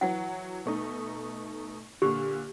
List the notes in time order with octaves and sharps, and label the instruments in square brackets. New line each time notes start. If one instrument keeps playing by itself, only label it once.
[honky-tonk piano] E3 F#3 [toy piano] F#5
[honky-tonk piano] B2 A3 D#4
[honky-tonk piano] A#2 D3 [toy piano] G4